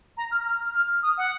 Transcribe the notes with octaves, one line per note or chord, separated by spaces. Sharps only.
A#5
F6
F6
F6
D#6
F#5